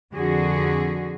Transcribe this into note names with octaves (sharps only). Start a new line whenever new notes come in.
F2 D3 F#4 G#4